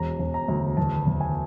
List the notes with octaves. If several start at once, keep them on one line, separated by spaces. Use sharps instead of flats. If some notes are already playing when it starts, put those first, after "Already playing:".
Already playing: E1 A#5
E1
A#5
D2
E2 A5
E2
G#5